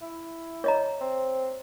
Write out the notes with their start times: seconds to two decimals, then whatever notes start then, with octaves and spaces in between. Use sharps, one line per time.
0.02 E4
0.64 C#5 D#5 A#5
1.01 C4